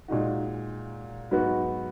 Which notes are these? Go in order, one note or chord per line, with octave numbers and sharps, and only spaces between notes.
A#2 G#3 D#4 F#4
G#2 F#3 B3 F#4